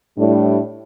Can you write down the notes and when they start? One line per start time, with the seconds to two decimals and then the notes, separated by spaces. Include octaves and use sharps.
0.16 A2 G3 D4